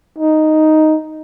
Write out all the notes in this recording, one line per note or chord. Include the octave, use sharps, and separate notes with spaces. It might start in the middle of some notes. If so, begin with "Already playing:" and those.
D#4